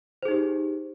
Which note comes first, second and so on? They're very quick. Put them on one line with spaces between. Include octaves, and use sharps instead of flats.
C5 G#4 D#4 G4